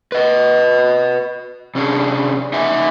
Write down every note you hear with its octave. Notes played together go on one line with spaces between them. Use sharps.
B4 D#5
C3 C#4 D4 G#4
D#4 D#5 E5 F#5 G#5